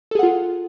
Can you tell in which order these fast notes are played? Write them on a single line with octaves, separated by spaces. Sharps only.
A4 G#4 F#5 F4